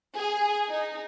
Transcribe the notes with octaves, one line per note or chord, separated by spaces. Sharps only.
G#4
D#4